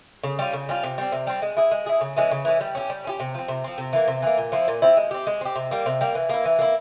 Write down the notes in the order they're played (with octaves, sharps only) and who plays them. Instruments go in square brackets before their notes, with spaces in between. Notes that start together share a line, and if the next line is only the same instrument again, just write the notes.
[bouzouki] C#3
G3 C#4 F4
C#3
G3 C#4 F4
C3
G3 C4
C3
G3 C4
G#3
E4 G#4
G#3
E4 G#4
C#3
E3 G#3 C#4
C#3
E3 G#3 C#4
G3
C#4 E4 G4
G3
C#4 E4 G4
C3
F3 C4
C3
F3 C4
C3
E3 A#3
C3
E3 A#3
A#2
F3 C4 E4
A#2
F3 C4 E4
G#3
C4 G4
G#3
C4 G4
C3
G3 A#3
C3
G3 A#3
E3
A#3 E4
E3
A#3 E4